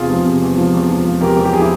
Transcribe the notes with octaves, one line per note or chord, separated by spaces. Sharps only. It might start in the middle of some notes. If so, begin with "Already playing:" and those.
Already playing: E2 C3 F4 G#4
F3
C3
E2
F3
E2
F3
F3
E2 G4 A#4
E2
G4
F3 G#4
E4 G4